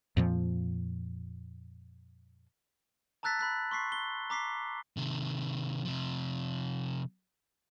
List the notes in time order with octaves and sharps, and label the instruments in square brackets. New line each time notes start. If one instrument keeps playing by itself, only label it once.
[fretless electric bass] F2 A#2 F3
[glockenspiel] A5 A#5 E6 F#6 A6 B6
B5 F#6 B6
C6 C#6 B6 C7
G7
A#5 D6 B6 C7
[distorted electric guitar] C3 D#3
C3 F3